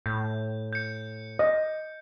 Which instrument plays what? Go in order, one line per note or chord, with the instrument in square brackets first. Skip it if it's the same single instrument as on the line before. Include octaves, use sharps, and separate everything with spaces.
[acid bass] A2 [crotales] G6
[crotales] G6 C#7
[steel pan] D#5